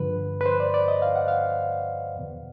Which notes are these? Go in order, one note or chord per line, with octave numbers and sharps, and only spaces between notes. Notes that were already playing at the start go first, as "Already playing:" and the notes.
Already playing: G2 D3 F3 B4
B4
C5
D5
D5
D#5
F5
F#5
F5
E2 B2